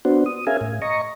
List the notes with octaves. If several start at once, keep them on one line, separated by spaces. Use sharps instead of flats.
B3 D4 F#4 C5
D#6
C#4 G#4 A#4 E5 F5 G#5
A2
D#5 A#5 C#6